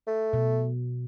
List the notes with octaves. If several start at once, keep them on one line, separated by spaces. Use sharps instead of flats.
A3
B2